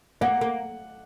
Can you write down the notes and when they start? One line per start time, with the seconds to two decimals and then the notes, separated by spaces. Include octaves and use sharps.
0.21 A#3 F#5
0.41 A#3